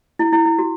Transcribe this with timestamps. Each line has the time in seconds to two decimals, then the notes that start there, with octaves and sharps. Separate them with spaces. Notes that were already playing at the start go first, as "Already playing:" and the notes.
0.19 E4
0.33 E4
0.46 E4
0.59 F#4